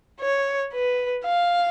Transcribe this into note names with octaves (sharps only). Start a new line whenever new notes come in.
C#5
B4
F5